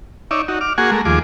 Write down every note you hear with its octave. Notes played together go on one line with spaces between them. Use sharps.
D#4 C#5 D5 E5
D#4 F#4
D6 F6
A#3 F#4 G#4 F#5 G#5 C#6
G#3 A3 A#4
D#2 F3 G#4 D6